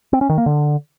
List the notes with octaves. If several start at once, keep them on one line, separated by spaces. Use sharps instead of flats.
C4
C#4
D#3
A#3
D3